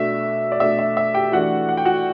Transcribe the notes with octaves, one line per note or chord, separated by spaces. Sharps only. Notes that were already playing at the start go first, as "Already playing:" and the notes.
Already playing: B2 A3 D4 E5
D5
B2 A3 D4 E5
E5
E5
G4 G5
E3 A3 D4 F#4 F#5
F#5
G5
F#4 F#5